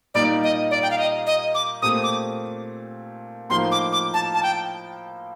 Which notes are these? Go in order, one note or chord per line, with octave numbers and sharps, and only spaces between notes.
A#2 G3 A#3 D#4 D5
D#5
D5
G5
F5
D#5
D#5
D6
A#2 A3 C4 G4 D#6
D6
A2 F3 A#3 D#4 A#4 C6
D6
D6
A5
A5
G5